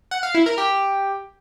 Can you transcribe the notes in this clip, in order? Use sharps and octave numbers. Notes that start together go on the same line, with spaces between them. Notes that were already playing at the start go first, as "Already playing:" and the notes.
F#5
F5
E4
A#4
G4